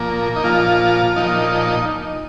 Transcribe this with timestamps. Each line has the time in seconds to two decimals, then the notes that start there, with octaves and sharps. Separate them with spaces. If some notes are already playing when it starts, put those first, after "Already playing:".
Already playing: A#2 F3 A#3
0.36 D#4
0.43 A#2 F3 F4
1.16 A#2 F3 D#4